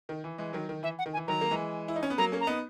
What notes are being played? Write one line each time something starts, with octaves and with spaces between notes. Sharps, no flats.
D#3
E3
E3 G#3
D#3 F#3
D#3
E3 E5
F#5
D#3
G#5
E3
D#3 F#3 A#5
A#3
E3 G#3
E4
D#4
C#4
B3
F#3 A#3 A#5
A#3 C#4
A#5
B3 D#4